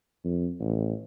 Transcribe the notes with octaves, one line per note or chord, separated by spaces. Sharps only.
F2
A1